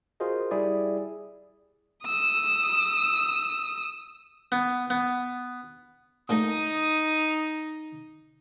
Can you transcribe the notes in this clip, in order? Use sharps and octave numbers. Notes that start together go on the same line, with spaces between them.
F4 F#4 G#4 A#4 C5 D#5
G3 E4 G#4 D5
D#6 E6
B3
B3
A#2 G#3 A3 D#4 D#6